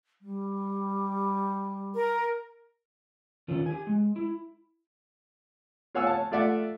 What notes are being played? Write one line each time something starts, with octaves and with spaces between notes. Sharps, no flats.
G3
A#4
D3 D#3 C#4 F4
G4 G#5
G#3
E4
F4 C#5 F5 F#5 G#5 E6
C#5 A5
A3 F4 A4 D5 E5 F#5